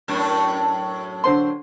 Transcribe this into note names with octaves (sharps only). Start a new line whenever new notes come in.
F#2 A2 D4
D3 C5 C6